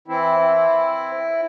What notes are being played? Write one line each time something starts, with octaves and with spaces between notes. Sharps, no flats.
E3 C4 E4
C4